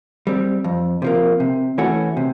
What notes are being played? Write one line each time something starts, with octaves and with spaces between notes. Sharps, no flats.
G3 C4
F2
C3 F3 A#3
C3
E3 A3 C#4 F#4
C3